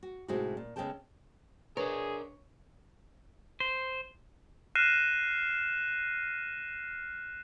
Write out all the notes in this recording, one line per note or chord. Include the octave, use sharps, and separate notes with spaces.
F#4
A2 C3 G#3 D#4 E4 F#4
A#2
C#3 G#3 B3 A4 G5 A5
D4 G#4 A#4 B4 C#5
C5
F6 F#6 A#6 C7 D#7 E7